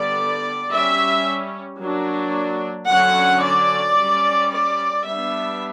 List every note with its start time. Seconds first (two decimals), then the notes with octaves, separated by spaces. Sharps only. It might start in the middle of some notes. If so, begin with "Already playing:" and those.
Already playing: D3 G3 B3 D5
0.71 G3 C#4 E5
1.81 F#3 A#3 D4
2.88 D3 F#3 C#4 F#5
3.43 D5
3.97 G3 C#4
4.51 D5
5.05 G3 B3 D4 E5